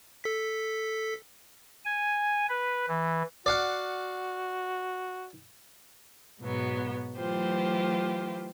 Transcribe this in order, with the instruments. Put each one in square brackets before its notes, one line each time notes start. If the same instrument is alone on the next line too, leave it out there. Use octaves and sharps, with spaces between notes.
[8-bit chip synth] A4 B6
[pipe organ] G#5
B4
E3
[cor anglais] F#4 [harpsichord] D5 F5 F#5
[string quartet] G#2 B2 F#3 B3
E3 F#3 A3 F4 G4 C5